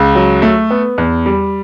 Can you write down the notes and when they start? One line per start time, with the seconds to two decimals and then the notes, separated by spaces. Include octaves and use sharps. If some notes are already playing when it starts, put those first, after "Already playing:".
Already playing: C#2
0.15 F#3
0.42 A3
0.71 B3
0.98 E2
1.26 G3